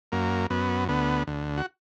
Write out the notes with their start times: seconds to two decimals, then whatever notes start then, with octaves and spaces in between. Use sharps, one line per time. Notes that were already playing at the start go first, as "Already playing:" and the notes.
0.12 F#2 A#3
0.50 F#2 B3
0.88 D2 B3
1.27 D2
1.57 F#4